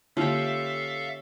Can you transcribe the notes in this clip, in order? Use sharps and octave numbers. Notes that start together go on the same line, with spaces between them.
D3 A#3 C#4 F4 G4 A4 E5 F5